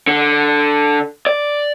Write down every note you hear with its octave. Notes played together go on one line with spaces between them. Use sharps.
D3
D5